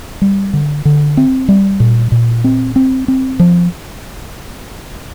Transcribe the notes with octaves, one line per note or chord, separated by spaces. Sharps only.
G3
D3
D3
C4
G3
A#2
A#2
C4
C4
C4
F3